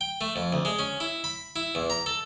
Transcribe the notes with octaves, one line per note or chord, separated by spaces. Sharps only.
G5
A3
F2
D2
G#3
C#4
E4
B5
E4
E2
A#5
A4